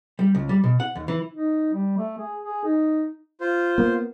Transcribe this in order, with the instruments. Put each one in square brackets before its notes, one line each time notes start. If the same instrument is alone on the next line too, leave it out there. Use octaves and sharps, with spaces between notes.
[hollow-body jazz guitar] G3
C#2
G3
B2
F#5
D#2
E3
[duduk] D#4
G3
A3
G#4
G#4
D#4
[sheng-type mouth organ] F4 C5
[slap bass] A#3 B3